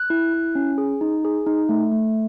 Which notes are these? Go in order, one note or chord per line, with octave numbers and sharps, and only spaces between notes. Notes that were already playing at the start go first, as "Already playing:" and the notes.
Already playing: F#6
E4
E4
C#4
G#4
D#4
G#4
D#4
A3
A3